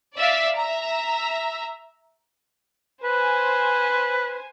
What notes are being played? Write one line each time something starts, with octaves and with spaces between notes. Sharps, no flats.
D5 E5 F5
E5 A#5
B4 C5 G#5